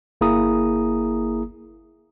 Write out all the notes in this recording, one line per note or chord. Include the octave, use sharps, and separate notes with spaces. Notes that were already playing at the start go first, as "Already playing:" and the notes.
G1 A#3 E4 G#4 A#5 D#6